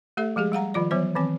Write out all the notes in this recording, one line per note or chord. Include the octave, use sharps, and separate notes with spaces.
A3 G4 A4 E5
F3 G#3 G4 G#4
G3 F5 F#5 A#5
D#3 F3 F4 D5
E3 F#3 B3 C5 C#5
D#3 E3 C4 G#5